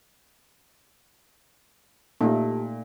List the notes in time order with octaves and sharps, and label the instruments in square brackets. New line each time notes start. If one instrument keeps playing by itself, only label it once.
[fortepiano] A#2 [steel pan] A3 D#4 [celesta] G4 A5